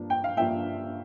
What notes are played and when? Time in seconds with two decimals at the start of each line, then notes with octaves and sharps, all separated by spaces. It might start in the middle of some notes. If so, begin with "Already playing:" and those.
Already playing: G2 F3 A#3 D4
0.10 G5
0.24 F5
0.37 G2 F3 A#3 D4 F4 E5 G5